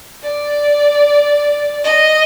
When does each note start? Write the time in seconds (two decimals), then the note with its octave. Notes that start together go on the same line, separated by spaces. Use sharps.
0.23 D5
1.84 D#5